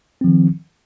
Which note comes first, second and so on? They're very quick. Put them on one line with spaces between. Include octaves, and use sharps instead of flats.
C4 F3 D#3